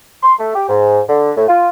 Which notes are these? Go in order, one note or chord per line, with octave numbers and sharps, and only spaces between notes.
C6
A3
G4
G#2
D3
A2
F4